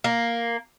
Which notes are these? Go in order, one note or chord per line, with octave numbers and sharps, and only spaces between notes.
A#3